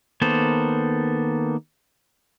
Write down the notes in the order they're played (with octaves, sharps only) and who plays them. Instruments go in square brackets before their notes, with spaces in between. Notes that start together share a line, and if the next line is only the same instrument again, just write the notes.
[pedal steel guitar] D#3 A#3 B3 A4 C5